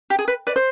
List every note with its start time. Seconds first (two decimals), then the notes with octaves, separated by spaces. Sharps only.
0.10 G4
0.19 G#4
0.28 B4
0.47 B4 D5
0.56 C5